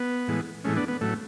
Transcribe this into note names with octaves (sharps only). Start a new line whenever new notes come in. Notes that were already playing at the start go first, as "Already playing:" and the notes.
Already playing: B3
A2 E3 G#3
A2 E3 G#3 A3 C#4
B3 D4
B3
A2 F#3 A3